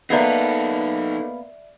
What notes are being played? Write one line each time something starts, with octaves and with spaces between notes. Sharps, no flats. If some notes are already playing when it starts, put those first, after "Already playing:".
A#3 B3 D#4 A4 D5 E5 C7